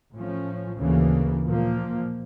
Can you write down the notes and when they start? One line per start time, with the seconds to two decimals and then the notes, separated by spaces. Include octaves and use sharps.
0.14 A2 F3 C#4
0.79 D2 C#3 E3 A#3
1.44 A#2 F3 A#3